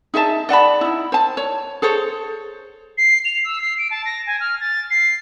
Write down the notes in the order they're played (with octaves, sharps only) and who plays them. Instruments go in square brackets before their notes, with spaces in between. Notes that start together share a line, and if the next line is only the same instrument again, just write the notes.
[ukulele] D#4 G#4 E5 A5
D5 F#5 A5 B5
D#4 E4
C5 A5
C#5
G#4 A4 C5 C#5
[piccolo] C7
F7
E6
C7
D7
A5
A#6
G#5
F6
A6
C7